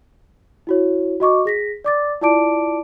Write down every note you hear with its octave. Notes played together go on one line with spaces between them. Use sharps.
E4 F#4 C#5
F#4 D#5 C#6 D6
G#4 A#6 B6
D5 D6 A6
E4 F4 D5 A5 D6 D7